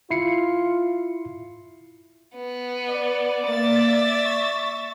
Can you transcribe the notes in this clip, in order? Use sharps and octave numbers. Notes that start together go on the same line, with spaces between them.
E4 F4 C7 C#7
B3
D5
A#3 E5 A6
C#6